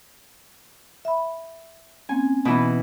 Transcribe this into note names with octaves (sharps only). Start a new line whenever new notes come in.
E5 B5
A#3 C4 C#4 G#5
B2 E3 B3